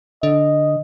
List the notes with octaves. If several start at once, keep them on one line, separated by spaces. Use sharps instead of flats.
D3 D#5